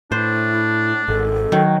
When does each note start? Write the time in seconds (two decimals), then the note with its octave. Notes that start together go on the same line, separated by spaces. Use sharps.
0.12 A2 D4 E4 C5
1.08 G#1 A4
1.52 D#3 F#3